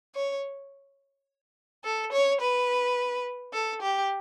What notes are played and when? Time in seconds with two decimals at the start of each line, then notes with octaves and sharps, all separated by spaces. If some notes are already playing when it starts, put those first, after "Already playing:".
0.16 C#5
1.85 A4
2.13 C#5
2.41 B4
3.54 A4
3.82 G4